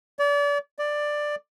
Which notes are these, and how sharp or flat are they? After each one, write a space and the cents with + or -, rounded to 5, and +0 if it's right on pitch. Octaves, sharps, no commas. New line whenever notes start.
D5 -35
D5 +10